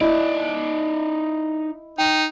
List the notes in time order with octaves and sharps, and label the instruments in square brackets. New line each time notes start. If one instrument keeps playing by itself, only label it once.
[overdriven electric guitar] D#4 D5 [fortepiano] E4 [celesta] D#5
[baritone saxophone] D#4 [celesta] G5